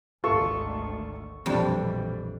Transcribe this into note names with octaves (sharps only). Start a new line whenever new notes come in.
G#1 D2 D#3 F4 A4 C#6
A#1 F2 B2 E3 G3 D4